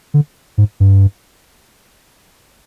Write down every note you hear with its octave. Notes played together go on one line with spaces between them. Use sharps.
D3
G#2
G2